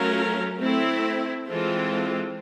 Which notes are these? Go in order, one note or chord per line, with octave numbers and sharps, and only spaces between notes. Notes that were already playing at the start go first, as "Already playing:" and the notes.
Already playing: F#3 A3 C#4 F4 A#4
A3 C4 E4
E3 G#3 C4 F4 A4